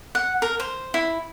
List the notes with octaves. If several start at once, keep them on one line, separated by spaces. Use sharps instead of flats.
F#5
A#4
C5
E4